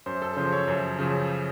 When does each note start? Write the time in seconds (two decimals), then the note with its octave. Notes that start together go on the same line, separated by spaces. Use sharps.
0.06 F#2 C5
0.22 A4
0.37 C#3 F3 C5
0.52 C#5
0.68 F#2 C5
0.99 C#3 F3